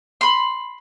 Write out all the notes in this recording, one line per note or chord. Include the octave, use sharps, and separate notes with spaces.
B5 C6